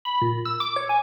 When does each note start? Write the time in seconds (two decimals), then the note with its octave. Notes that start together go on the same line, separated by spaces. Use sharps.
0.05 B5
0.22 A#2
0.45 E6
0.60 D6
0.76 C#5
0.89 G#5